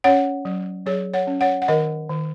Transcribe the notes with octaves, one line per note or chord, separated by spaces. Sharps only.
C#4 C#5 F#5
F#3
F#3 G#4 C#5
C#5 F#5
C#4
C#5 F#5
F#5
D#3 A#4 D#5
D#3